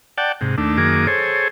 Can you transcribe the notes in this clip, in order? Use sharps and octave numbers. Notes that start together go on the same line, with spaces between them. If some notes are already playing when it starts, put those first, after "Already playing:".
D5 F#5 G5 A5
G#2 C3
D#2 A3 D4
F#2 D#3 A#3 G#4 D6
G#4 A4 C5 C#5